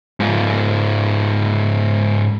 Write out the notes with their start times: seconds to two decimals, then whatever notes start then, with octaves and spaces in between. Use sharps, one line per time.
0.20 G#2 F4